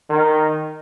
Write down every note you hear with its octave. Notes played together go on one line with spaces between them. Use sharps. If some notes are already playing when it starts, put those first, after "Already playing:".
D#3